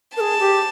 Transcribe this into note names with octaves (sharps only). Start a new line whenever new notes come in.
G#4 A#4 A5
G4